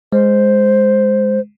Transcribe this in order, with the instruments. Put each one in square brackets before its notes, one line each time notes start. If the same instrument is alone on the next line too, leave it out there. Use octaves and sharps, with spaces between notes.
[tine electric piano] G#3 [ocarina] C5